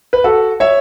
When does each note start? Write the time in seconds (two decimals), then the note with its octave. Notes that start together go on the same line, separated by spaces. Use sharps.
0.13 B4
0.24 F#4 A4
0.60 C#5 E5